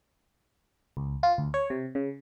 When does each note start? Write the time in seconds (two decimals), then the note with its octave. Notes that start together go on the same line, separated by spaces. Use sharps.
0.97 C#2
1.23 F4
1.38 D2
1.54 C#5
1.70 C3
1.95 C#3